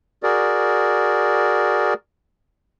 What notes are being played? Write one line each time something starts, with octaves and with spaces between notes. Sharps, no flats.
F#4 G#4 A#4 D5